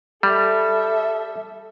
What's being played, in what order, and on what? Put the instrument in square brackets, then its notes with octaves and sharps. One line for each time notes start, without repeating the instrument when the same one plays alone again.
[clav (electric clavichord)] G3 [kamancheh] A4 E5